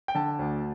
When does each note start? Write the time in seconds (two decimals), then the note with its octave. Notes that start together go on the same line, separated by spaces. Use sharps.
0.08 G5
0.15 D3 A5
0.39 D2